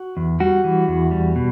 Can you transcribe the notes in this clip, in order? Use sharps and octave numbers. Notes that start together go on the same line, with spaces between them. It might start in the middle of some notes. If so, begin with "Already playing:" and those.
Already playing: F#4
E2
G3 F#4
E3
E2
G3
B2